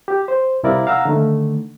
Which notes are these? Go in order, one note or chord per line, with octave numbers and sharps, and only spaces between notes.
G4
C5
C2 C3 E4 A#4 D5 F5
F5 F#5 A#5 E6
D3 D#3 A3